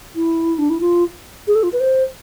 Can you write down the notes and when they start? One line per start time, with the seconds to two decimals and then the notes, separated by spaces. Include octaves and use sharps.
0.15 E4
0.58 D4
0.70 E4
0.81 F4
1.47 G#4
1.55 A4
1.63 F4
1.73 B4
1.80 C5